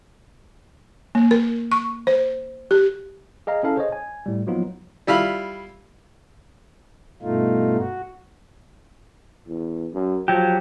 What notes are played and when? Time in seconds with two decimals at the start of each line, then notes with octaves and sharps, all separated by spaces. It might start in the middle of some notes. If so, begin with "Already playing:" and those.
1.15 A#3
1.31 A#4
1.72 C#6
2.07 C5
2.71 G4
3.47 G#4 D#5 F5 A#5
3.63 C#4 E4 A4 F5 A5
3.76 G#4 C5 C#5 D#5
3.92 G#5
4.26 A2 G3
4.47 F3 F#3 A#3 B3 D#4 F4
5.07 G3 E4 F4 B5
7.22 G2 B2 A3 D#4 F4
7.78 F#4
9.48 E2
9.94 F#2
10.28 F3 F#3 G4